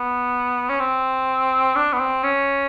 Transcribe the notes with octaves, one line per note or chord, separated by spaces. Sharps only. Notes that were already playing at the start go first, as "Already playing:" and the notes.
Already playing: B3
C#4
C4
D4
B3
C4
C#4